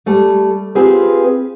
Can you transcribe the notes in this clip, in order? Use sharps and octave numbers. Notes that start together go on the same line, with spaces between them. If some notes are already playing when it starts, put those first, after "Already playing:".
G3 A3
C4 F4 G4 G#4 B4